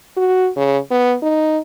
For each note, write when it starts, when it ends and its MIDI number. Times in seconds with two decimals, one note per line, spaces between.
0.17 0.48 66
0.56 0.78 49
0.91 1.16 59
1.22 1.58 63